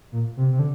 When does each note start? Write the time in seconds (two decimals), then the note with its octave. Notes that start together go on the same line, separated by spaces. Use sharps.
0.12 A#2
0.37 C3
0.52 C3
0.59 D3